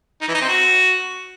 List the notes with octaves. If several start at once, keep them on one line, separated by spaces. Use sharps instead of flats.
D#4
E3
D#4
C4
F#4